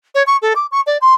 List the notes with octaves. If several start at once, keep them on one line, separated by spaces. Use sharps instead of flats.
C#5
C#6
A4
D6
C#6
D5
C6